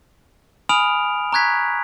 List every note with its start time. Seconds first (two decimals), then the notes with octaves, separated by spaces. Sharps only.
0.69 G#5 B5 D#6 F6 D7 F7
1.33 A#5 C#6 F#6 G#6 B6